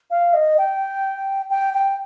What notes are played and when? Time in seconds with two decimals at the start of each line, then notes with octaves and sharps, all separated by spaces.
0.11 F5
0.34 D#5
0.58 G5
1.50 G5
1.74 G5